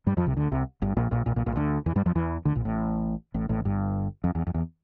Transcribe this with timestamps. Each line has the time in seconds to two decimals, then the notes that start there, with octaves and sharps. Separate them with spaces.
0.07 G2 G3
0.17 F2 F3
0.27 C2 C3
0.37 D2 D3
0.52 C2 C3
0.82 G1 G2
0.97 A#1 A#2
1.11 A#1 A#2
1.26 A#1 A#2
1.36 A#1 A#2
1.46 A#1 A#2
1.56 D2 D3
1.86 E2 E3
1.96 G2 G3
2.06 F2 F3
2.15 E2 E3
2.45 D2 D3
2.55 A#1 A#2
2.65 A1 A2
3.34 A1 A2
3.49 A1 A2
3.65 G1 G2
4.24 F2
4.35 E2
4.47 F2
4.54 E2